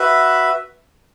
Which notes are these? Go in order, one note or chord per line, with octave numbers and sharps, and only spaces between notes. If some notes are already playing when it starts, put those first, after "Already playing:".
Already playing: F#4 B4 E5